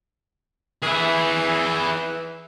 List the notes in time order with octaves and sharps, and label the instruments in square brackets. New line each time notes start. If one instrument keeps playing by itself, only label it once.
[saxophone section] E3 [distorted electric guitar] E4 G#4